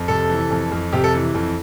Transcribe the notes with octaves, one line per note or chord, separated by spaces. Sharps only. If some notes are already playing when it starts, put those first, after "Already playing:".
Already playing: F2
C3 A4
E3
F2
F2
C3 G4
A4
E3
F2